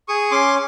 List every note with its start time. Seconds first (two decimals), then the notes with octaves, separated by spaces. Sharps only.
0.08 G#4 C#6 D#6
0.31 C#4 C6 D6